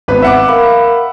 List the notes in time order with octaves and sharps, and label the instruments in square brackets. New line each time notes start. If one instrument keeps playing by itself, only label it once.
[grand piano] G#1 B3 B4
E5 F#5 D6
[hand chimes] A#4 F5 B5